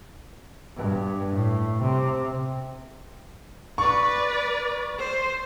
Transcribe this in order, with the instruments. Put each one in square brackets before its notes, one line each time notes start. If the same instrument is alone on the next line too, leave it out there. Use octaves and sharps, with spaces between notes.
[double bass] G2
A2
C3
[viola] B4 D5 [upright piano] C#6
[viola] C5